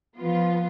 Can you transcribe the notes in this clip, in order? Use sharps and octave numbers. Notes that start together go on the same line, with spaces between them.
F3 B3 F4